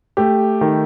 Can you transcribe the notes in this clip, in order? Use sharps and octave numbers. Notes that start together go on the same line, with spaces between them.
A3 G4
D#3